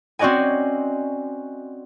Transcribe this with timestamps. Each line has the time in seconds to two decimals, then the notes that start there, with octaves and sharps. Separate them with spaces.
0.19 C4 C#4 F#4 D5 D#5 G#5